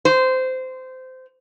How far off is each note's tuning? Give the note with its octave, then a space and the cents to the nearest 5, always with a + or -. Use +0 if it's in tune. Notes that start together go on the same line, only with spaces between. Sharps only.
C5 -20